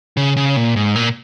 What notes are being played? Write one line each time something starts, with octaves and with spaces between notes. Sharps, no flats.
C#3
C#3
A#2
G#2
A#2